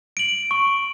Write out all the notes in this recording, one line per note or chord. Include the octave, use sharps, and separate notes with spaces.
D7 F#7
C#6